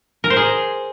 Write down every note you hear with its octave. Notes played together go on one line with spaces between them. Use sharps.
A#4
C5
G#4